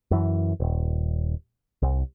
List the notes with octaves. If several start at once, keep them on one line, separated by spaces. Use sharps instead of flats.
F#2 E3
D#1
C2